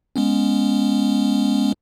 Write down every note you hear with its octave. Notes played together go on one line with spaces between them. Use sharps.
G#3 B3 C#4